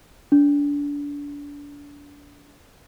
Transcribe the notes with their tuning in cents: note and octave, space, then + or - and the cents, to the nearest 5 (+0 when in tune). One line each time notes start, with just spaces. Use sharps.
D4 -30